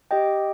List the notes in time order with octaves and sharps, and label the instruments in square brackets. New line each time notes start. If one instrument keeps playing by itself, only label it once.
[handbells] G4 D#5 G5